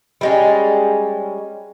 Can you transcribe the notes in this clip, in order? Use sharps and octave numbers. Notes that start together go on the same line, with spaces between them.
G3 G#3 C#4